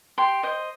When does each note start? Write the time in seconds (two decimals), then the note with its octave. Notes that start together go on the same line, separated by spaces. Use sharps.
0.18 G4 C6
0.43 C5 D#5